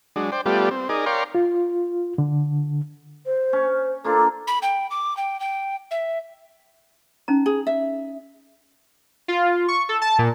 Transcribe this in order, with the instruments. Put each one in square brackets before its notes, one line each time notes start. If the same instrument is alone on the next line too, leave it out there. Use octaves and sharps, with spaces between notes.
[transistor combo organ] F#3 G#3 D4
C5 D5 G5
G3 A3 B3 F4 G4 D5
C4
D#4 G#4 A#4 D5
A#4 C#5 D5 F5 G5 C6
[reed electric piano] F4
D3
[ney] C5
[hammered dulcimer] C#4
[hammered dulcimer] A#3 D4 F4 [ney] A4
[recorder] B5
G5
D6
G5
G5
E5
[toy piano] C#4 D#4 A#5
[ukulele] G#4
E5
[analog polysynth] F4
C#6
A4
A5
A#2